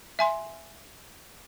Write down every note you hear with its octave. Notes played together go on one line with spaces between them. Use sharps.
E5 G#5 C6